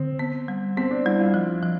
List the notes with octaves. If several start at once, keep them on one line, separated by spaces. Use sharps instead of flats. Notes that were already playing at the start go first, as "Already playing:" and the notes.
Already playing: D3 C4
B3
G3
B3 C4
D4
G3 E4
F4
F3
F3